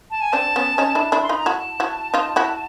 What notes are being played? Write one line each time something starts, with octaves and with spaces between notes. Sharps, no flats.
A5
G#5
C4 D4 A5
B3 C#4
C#4 D#4
D4 E4
D4 E4
C6
D#4 F4 B5
A#5
E4 F#4 A5
E4 F#4
D#4 F4
E4 F#4